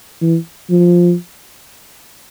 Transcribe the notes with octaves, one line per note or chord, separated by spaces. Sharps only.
E3
F3